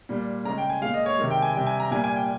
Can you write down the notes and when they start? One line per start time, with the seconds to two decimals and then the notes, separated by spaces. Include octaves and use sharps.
0.09 A#2 G3
0.45 C#3 A#5
0.50 G#3
0.58 G5
0.70 G#5
0.82 A#2 G#3 F5
0.94 D#5
1.06 C#5
1.18 C3 D#3 G#3
1.31 G5
1.42 G#5
1.55 C3 G3 G5
1.66 G#5
1.80 A#5
1.91 A#2 G3 G#5
2.04 G#5
2.16 G5